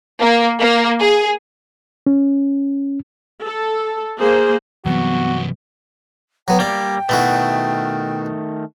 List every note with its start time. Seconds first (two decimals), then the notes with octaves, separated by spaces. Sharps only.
0.21 A#3
0.60 A#3
1.00 G#4
2.07 C#4
3.44 A4
4.19 A#3 G#4 C5
4.86 G2 C3 E3 F#3 B3 F#4
6.48 F#3 B3 G5
6.60 G3 A#3 D5
7.09 B2 D#3 A3 E4 F#4